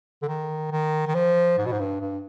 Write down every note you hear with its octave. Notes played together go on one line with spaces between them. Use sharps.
D3
D#3
D#3
D#3
F3
G#2
B2
G#2
G2
G2